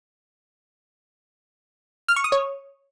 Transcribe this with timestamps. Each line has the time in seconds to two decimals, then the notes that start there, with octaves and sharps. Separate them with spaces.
2.08 F6
2.16 C#6
2.24 D#6
2.32 C#5